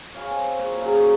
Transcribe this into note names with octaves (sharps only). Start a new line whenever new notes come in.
C#5 F5 G#5 B5
C4 D#5
A#2 C#5
C#3 F#3 D#4 F5
C#5 C#6